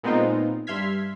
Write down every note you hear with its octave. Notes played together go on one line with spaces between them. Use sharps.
A#2 G#3 B3 C4 D#4 F4
G2 E5 C6 F6 G#6 B6